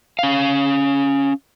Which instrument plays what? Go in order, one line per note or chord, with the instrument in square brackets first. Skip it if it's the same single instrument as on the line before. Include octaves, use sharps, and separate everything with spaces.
[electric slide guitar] C#4 F5